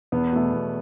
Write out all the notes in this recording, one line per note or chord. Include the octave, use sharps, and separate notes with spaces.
E2 B3
B2 A3
E2